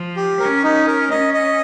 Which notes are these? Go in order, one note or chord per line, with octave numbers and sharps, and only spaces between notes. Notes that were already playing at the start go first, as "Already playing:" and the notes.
Already playing: F3
G4
C#4 A#4
D#4
A#4
C#4 D#5
D#5